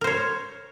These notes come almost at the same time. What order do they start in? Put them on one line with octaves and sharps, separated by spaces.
A#4 C5 C#5